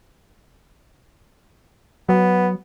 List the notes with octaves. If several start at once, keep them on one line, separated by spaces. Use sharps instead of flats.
F#3 B3